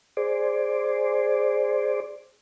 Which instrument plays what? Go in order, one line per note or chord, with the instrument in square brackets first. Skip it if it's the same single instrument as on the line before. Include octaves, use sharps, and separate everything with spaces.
[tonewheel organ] G#4 C5 D5